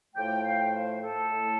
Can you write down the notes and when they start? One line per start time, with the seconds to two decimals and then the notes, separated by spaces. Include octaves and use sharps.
0.15 A2 F3 A3 G5
0.43 F5
0.73 C5
1.01 A4
1.31 A2 A3